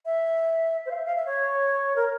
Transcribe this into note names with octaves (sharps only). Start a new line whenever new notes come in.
E5
C5
F5
E5
F5
E5
C#5
A#4